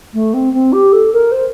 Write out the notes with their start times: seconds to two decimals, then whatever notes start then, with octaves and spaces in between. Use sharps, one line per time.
0.14 A3
0.34 C4
0.54 C4
0.73 G4
0.93 A4
1.13 A#4
1.32 C5